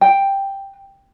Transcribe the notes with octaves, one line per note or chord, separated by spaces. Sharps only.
G5